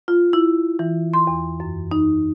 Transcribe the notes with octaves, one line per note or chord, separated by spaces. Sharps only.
F4
E4
E3
C6
E2
F#2
D#4